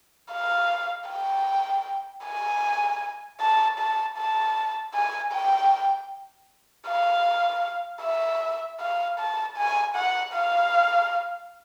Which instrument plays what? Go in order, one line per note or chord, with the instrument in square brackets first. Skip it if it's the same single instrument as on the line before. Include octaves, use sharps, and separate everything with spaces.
[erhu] F5
G5
G#5
A5
A5
A5
G#5
G5
F5
E5
F5
A5
G#5
F#5
F5